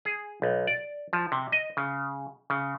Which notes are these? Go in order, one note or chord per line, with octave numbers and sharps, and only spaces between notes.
G#4
B1
D5
F3
C3
D#5
C#3
C#3